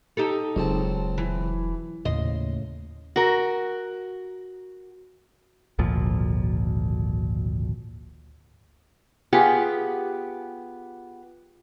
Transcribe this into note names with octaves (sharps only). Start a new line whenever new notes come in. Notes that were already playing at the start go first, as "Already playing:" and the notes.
D#4 G4 A4
E1 C#2 F#3 C4 A5
E3
D#2 A2 C#3 D#5 C6
F#4 A#4
G#1 D2 A#2 F3
B3 F4 G4 G#4 F#5